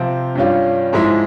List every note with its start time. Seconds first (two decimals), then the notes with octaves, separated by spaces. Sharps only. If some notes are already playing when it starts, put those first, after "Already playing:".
Already playing: C3 F3 C4 F4
0.35 G2 G3 C#4 F4
0.93 G#2 F3 G#3 E4